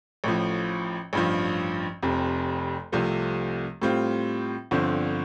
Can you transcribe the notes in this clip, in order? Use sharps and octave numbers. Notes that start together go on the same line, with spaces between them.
A1 A2 F3
A1 G2 F3
F1 F2 C3
C2 C3 F3 A3
A2 G3 C4 F4
G1 G2 D3 F3 C4